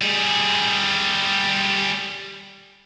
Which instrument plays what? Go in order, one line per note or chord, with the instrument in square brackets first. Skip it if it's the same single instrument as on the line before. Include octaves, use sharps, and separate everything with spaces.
[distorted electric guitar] G3 G#4